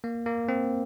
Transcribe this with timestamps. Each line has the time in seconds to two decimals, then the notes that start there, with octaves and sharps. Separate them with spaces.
0.04 A#3
0.26 A#3
0.49 C4